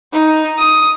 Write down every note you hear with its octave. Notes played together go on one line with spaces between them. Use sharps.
D#4
D#6